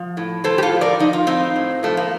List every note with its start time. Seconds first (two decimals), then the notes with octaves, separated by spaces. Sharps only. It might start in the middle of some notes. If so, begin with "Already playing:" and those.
Already playing: F3
0.17 A2
0.44 A2 A4 C5
0.58 G4
0.62 F4 A4
0.71 F3
0.81 A#4 D5
0.99 F3 D#4
1.13 F4
1.27 A2 C4 D#4
1.56 A2
1.83 F3 A3
1.97 A#3